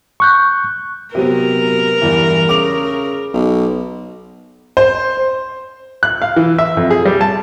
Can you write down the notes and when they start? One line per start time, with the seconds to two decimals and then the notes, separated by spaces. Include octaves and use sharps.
0.20 C#6 F#6 G6
1.15 C3 F#3 B3 A#4
2.01 E2 G2 E3
2.49 C#3 D6 F7
3.34 B1
4.77 C5
6.03 F#6
6.22 F5
6.36 E3
6.58 E5
6.77 F2
6.91 G#4
7.05 G3
7.21 A5